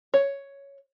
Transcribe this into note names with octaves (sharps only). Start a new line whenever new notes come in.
C#5